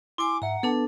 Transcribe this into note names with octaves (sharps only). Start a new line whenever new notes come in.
E4 G#5 C6 D6
G#2 E5 F#5 A#5
B3 D4 A4 B4 A5